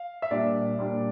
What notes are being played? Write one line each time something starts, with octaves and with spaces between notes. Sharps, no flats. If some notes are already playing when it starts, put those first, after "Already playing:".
Already playing: F5
E5
A#2 G3 D4 D5
A#2 G3 D4